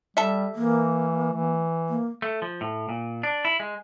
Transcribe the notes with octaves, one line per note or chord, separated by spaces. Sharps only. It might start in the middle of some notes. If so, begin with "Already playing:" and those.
G3 A4 E5
E3 A#3
E3
A#3
A3
F3
A2
A#2
D4
E4
G#3